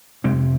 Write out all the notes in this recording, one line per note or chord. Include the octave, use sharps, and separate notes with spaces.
F2 C3 G#3 C4